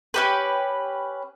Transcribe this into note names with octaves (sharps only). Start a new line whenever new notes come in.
C#4 G4 B4